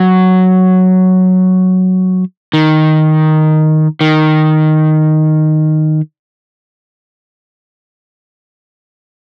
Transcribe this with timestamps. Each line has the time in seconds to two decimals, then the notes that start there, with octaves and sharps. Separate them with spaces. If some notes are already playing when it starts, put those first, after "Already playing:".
Already playing: F#3
2.53 D#3
4.01 D#3